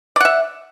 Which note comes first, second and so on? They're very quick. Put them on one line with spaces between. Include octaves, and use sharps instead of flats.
D5 F#5 E5